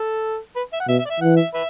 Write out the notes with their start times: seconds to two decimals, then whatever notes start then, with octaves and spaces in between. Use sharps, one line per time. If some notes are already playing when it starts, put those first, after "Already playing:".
Already playing: A4
0.56 B4
0.73 E5
0.80 F#5
0.88 B2 E5
0.99 E5
1.05 D5
1.10 E5
1.21 E3 F#5
1.36 E5
1.54 B4 E5